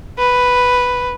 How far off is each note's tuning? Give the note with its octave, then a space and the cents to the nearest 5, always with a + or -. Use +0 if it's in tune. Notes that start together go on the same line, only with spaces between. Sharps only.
B4 +0